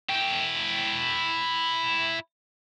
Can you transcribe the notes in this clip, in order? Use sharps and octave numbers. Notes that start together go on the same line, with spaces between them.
E4 G5